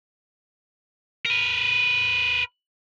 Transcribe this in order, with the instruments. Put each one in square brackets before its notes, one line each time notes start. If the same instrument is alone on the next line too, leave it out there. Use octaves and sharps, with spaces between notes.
[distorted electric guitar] A#4 B4